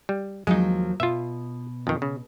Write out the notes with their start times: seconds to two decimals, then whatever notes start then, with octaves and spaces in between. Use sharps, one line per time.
0.09 G3
0.47 D#2 F3 F#3 G#3 D#4
1.00 B2 F4 E5
1.87 F2 D#3
2.02 C#3